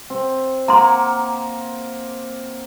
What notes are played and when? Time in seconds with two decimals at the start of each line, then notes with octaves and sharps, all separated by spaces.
0.10 C4
0.68 A#3 F#5 A#5 C6